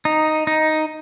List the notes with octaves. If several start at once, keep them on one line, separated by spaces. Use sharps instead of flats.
D#4
D#4